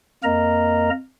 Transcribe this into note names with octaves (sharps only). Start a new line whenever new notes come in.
F2 A#3 A#4 D#5 A#5